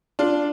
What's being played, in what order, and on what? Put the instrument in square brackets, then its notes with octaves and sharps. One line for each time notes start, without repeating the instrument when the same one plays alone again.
[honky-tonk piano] D4 F4